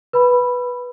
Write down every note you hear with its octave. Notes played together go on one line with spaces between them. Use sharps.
B4 B5